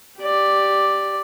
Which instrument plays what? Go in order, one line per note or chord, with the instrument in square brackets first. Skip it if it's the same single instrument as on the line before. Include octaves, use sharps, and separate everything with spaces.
[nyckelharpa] G4 D5